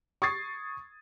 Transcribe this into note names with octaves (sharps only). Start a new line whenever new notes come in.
C#6 D#6 G#6 A6 C7